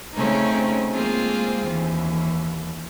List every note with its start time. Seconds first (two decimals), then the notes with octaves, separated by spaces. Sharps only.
0.15 C#3 A3 C4 C#4 D#4
0.92 G#3 A#3 C4 F4 G#4
1.64 D#2 E3